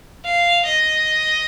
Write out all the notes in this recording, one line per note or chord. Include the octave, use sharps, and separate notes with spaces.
F5
D#5